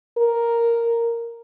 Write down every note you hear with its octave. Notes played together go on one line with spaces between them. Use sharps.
A#4